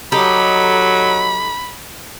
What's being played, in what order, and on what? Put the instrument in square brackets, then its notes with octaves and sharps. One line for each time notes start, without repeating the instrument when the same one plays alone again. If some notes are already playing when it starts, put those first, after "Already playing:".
[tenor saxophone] F#3 [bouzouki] D#4 G4 A4 [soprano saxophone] B5